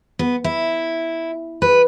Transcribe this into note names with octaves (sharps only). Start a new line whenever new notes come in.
B3
E4
B4